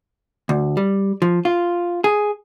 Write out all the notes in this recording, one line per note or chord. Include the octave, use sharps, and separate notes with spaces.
D2
G3
F3
F4
G#4